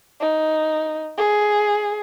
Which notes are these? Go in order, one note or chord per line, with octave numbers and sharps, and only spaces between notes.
D#4
G#4